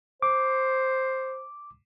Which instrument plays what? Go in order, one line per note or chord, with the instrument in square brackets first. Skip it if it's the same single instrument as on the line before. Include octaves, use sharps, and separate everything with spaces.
[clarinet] C5 [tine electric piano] D6